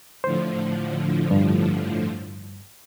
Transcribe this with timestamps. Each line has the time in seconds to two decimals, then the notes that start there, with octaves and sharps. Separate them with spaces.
0.24 A2 D3 F3 C5
1.31 G2